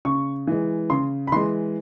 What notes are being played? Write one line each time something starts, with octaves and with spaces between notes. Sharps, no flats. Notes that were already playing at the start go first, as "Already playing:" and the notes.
C#3 C#6
E3 G#3
C#3 C6
B5
E3 G#3 C6